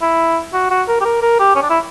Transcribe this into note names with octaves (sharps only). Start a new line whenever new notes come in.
E4
F#4
F#4
A#4
G4
A#4
A#4
G4
C#4
D4
E4